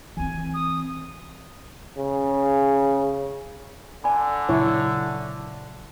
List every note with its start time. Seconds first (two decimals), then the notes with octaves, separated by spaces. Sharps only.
0.17 E3 C4 G#5
0.54 D#6
1.98 C#3
4.04 D3 D5 G#5 B5
4.49 A#2 C#3 F#3 E4 C#5